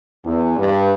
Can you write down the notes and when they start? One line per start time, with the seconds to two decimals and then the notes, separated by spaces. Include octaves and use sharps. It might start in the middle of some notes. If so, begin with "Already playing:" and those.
0.24 E2
0.57 G2